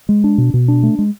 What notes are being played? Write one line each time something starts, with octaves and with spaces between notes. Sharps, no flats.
G#3
D4
B2
B2
D4
A3
G#3